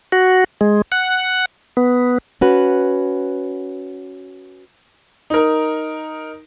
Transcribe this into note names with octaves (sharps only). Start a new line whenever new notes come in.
F#4
G#3
F#5
B3
C#4 F#4 B4
D#4 A#4